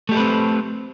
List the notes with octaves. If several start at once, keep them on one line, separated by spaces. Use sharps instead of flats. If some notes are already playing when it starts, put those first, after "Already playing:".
A3 C4 G4 A4 B4